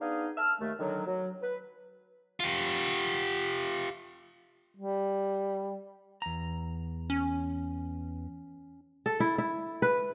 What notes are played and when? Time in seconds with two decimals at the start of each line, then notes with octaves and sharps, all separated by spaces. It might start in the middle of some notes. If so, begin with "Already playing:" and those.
0.01 B3 D4 D#4 G#4 F5
0.38 A5 E6 F6
0.60 D#2 A3
0.79 D3 D#3 F#3
1.07 F#3
1.43 B4
2.40 F4 G4
4.77 G3
6.22 E2 A#5
7.10 C#4
9.06 A4
9.20 E4
9.38 E4
9.82 B4